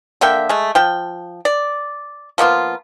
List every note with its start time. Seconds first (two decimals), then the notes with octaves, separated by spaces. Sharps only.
0.21 D3 A#3 E5 G5
0.49 G#3 A3
0.75 F3 G5
1.45 D5
2.38 F3 A#3 B3 F4